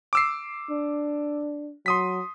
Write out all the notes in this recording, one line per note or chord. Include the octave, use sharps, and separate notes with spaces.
D6 E6 C7
D4
F#3 C6 D#6 B6